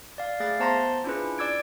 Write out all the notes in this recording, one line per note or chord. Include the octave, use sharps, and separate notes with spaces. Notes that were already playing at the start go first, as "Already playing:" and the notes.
D5 F5
A3 G#4 F5 A6
B3 C5 A5 A#5 C6 A#6
C#4 D4 E4 F4 G#4 B4
D5 D6 E6 G#6 D7